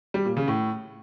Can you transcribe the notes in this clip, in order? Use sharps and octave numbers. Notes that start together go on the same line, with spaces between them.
G3
A#2
C#3
A2